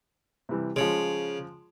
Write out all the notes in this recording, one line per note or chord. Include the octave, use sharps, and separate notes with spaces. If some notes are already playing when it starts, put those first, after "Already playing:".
C3 E3 G3
C#3 F3 G#3